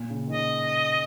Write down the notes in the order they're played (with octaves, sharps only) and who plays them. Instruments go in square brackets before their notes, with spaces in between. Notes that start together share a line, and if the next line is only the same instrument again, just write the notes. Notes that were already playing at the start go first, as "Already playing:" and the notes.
Already playing: [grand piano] A#2
C#3
D#3
[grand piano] C#3 [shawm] D#5